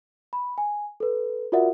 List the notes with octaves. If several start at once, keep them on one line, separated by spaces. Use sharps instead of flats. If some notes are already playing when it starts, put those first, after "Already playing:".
B5
G#5
A4 B4
F4 F#4 A#4 D5 E5 F#5